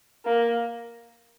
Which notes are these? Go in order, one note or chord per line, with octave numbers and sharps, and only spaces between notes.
A#3